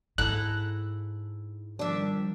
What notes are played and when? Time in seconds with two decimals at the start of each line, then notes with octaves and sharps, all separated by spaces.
0.18 G#2 E4 A4 A#5 F#6
1.79 D#3 F3 G3 D4 E5